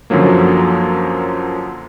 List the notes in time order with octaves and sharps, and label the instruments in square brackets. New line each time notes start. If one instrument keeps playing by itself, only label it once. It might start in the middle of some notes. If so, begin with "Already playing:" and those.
[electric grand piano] F#2 D3 F3 F#3 A#3